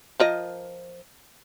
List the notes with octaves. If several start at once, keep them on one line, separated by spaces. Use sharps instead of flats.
F3 A#4 D#5